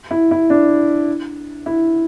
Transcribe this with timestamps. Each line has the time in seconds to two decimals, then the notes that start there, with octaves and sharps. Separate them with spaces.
0.11 E4
0.31 E4
0.50 D4
1.66 E4